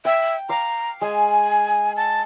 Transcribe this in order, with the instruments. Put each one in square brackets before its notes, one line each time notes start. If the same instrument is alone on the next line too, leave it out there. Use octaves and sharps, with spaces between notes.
[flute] E5 [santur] G5
[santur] F5 D6 [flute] A#5
[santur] G#3 [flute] G#5
[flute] A5